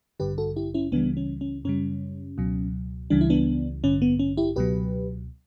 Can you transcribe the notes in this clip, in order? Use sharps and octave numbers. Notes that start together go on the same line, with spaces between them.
A1 G2 D3 G4 B4
F#4 A4
E4 G4
C#4 E4
C#2 C#3 E3 G3 B3 D4
C#4
C#4
F#2 C#3 G3 C#4
C#2 B2 F#3
C#2 C#3 E3 G3 D4
E4
B3 D4
A1 G2 D3 C#4
B3
C#4
E4 G4
C#2 B2 F#3 G4 B4